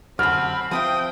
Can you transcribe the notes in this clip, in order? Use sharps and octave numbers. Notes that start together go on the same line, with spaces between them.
F#2 D3 C4 B5 F6
F3 C4 E5 G5 D#6